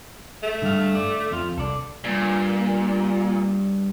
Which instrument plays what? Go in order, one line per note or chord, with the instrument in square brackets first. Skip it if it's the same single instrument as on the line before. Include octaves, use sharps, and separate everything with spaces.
[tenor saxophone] A3
[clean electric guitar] G2 F5 [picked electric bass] D3
[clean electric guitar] D5
F2 F4
[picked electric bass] C2 [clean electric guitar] A4 D5
[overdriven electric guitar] G2 [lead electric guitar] A#2